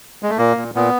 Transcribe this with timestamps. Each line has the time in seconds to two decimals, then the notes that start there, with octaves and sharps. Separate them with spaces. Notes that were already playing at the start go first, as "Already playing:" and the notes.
0.23 G#3
0.30 A3
0.38 A#2 A#3
0.57 A#2
0.75 A#2 B3